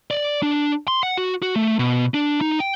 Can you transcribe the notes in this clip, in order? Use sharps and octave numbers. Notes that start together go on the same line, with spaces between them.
D5
D4
C6
F#5
F#4
F#4
A3
B2
D4
D#4
G5